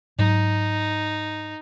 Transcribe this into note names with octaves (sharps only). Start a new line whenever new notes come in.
G#2 F#3 D#4